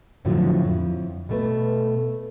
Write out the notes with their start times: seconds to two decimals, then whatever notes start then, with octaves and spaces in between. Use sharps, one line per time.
0.25 F2 A2 D3 F3 F#3
0.69 F2 E4
1.29 B2 A3 B4